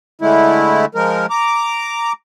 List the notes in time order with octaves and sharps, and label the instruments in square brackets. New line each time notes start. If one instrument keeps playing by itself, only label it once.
[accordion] D3 G#3 A3 E4
F3 G#3 A#4
A#5 D6